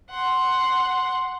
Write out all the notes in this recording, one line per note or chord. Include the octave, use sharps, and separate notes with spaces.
F#5 C6